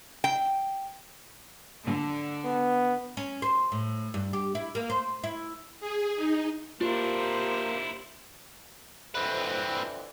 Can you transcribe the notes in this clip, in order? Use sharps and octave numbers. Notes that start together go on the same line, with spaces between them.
G5
D3
B3
C#4
C5
A2
G2
G4
E4
A#3
C5
E4
G#4
D#4
A#3 D4 E4 F4 G4 C5
F2 D3 E3 C4 B4